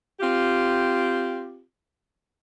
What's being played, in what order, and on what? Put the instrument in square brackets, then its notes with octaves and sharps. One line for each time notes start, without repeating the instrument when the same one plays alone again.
[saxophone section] C4 F4 G4